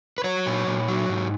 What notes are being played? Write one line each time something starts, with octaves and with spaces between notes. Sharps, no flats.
B4
F#3 C#5
A#2
A#2
F#3
G#2